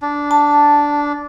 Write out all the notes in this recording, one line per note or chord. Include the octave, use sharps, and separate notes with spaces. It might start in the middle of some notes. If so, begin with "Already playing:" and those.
D4
A5